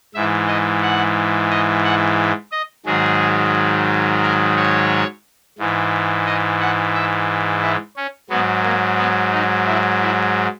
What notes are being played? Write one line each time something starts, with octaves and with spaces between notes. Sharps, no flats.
G#2 E3 E5
D#5
F#5
D#5
F#5
D#5
G#2 D#3 F#3 G#4
A#4
C#5
G#2 E3
D#5
F#5
E5
E4
C#4
G#2 F#3 B3
A#3
B3
D#4
E4
E4